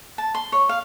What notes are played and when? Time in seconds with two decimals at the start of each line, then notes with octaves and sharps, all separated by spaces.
0.18 A5
0.35 C6
0.52 C#5
0.69 F5